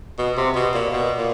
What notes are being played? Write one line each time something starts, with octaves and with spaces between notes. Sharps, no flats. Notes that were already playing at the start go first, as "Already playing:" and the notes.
B2
C3
B2
A#2
B2
A#2